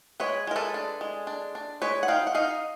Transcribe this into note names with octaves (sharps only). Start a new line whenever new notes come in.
G#3 B4 C#5
G#3 A#4
A4 B4
D4
G#3
D4
D4
G#3 B4 C#5
F#5
D#4 F5 G5
F#5
D#4 D#5 F5